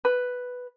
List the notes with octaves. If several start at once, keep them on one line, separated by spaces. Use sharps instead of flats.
B4